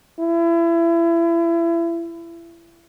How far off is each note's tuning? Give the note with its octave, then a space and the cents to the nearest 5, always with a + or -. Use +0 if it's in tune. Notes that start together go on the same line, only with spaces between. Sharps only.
E4 +30